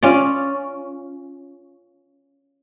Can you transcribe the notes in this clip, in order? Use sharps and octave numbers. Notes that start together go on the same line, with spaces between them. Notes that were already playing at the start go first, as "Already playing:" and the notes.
C#4 F4 D5